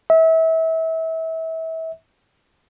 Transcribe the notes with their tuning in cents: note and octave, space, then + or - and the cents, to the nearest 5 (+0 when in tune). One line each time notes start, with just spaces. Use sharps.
E5 -30